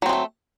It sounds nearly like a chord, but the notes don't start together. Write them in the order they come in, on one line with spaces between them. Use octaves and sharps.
F#3 C4 G#3 A3